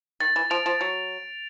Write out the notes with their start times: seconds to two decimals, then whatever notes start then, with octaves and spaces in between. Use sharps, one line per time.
0.20 D#3 A6
0.36 E3
0.50 F3 D7 F7
0.66 F3
0.80 F#3 A6